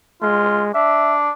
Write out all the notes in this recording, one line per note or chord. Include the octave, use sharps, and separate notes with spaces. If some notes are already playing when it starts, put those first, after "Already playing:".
G#3 F4
D4 E5